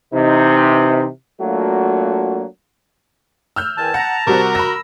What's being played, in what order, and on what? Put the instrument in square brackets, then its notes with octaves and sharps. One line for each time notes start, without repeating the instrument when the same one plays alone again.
[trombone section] C3 E3 D#4
F#3 A3 A#3 D4 F4 F#4
[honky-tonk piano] E6 F6 G6
[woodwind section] E2 D#3 G#5 [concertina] A5
[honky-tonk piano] F#5 [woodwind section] A#5
[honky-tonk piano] C3 G3 C4 [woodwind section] F#4 [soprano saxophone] A#4
[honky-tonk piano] B5 A#6 [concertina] E6